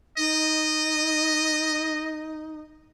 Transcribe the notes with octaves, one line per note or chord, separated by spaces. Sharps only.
D#4 D#5